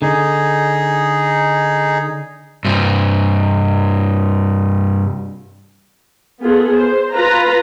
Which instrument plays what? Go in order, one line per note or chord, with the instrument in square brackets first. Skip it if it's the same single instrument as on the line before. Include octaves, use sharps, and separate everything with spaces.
[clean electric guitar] D3 [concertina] D#4 G#4
[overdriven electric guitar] G2 C3
[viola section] B3 F4 G#4 A4
C5
F4 B4 A#5